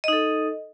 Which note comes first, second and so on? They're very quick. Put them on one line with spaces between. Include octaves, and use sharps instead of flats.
D#5 D#4 A4